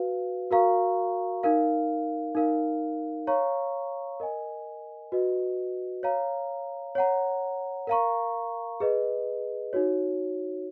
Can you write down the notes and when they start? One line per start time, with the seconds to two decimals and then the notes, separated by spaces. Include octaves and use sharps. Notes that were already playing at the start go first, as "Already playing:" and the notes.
Already playing: F#4 B4 F5
0.51 F#4 A#4 F5 A#5 C#6
1.43 D#4 A#4 F5
2.35 D#4 A#4 F5
3.27 C#5 F5 A#5 C#6
4.20 A#4 D#5 G#5
5.12 F#4 B4 D#5
6.03 C#5 F5 A#5
6.95 C#5 F#5 A#5
7.87 A#4 F5 A#5 C#6
8.80 G#4 B4 D#5
9.73 D#4 F#4 C#5